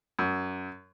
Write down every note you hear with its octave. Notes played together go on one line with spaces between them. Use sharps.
F#2